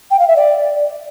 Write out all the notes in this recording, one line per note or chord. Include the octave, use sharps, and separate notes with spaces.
G5
F5
E5
D5